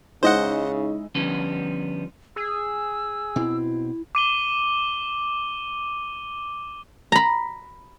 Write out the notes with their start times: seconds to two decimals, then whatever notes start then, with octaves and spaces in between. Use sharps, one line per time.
0.23 C#3 G#3 D#4 E4 C5 D#5 F#5
1.15 D3 F3 G3 B3 C#4
2.36 G#4 E6
3.36 B2 C4 E4
4.15 D6 D#7 G7
7.12 A#5 B5